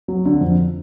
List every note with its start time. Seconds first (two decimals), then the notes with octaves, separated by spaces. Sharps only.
0.08 F#3
0.26 D3
0.41 F2